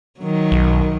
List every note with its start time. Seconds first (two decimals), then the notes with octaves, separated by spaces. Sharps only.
0.20 D#3 F#3
0.52 B1